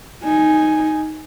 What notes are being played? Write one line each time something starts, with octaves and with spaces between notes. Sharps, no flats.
D#4 G#5